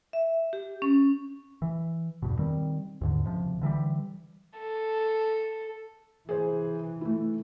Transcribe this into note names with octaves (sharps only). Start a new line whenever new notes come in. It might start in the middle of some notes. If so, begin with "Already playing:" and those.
E5
G4
C#4
E3
E2 G2 B2
D#3 G3 C4
D#2 G#2 D3
C#2 C3 F3
D3 E3 F#3 G3
A4
C3 E3 G#4 C5
A3 E4